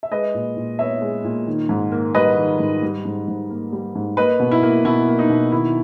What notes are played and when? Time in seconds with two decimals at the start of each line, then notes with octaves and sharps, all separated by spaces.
0.03 E5
0.11 G#3 B4 D#5
0.34 A#2
0.57 A#2
0.79 B3 C#5 E5
1.01 G#3
1.24 A#2
1.47 D#3
1.69 G#2
1.91 A#3
2.15 G3 B4 D#5
2.38 D#3
2.60 G#2
2.82 G3
3.05 G#2
3.28 G#2
3.50 A#3
3.73 G3
3.95 G#2
4.17 A#3 B4 D#5
4.40 B2
4.51 E4
4.62 A#3
4.85 B2 E4
5.08 A#3
5.19 D#4
5.29 B2
5.52 D#3 E4